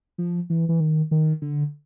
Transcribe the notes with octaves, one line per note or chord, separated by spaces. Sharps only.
F3
E3
E3
D#3
D#3
D3